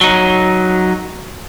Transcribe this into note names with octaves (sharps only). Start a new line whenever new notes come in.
F#3 D#4